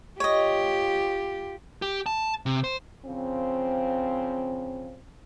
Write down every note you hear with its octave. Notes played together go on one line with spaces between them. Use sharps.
F4 G4 C#5 D#5
G4
A5
C3
C5
C#3 F3 C4